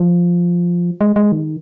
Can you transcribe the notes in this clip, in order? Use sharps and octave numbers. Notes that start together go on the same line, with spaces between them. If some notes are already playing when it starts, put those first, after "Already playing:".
Already playing: F3
G#3
G#3
D#3